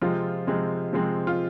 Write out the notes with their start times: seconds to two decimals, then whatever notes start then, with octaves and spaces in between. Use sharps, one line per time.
0.01 C3 F3 G#3 C4 F4
0.47 C3 F3 G#3 C4
0.93 C3 F3 G#3 C4
1.27 F4